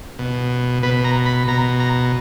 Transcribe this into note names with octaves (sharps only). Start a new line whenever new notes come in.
B2
B2 B4
A#5
B5
B2 A#5
A#5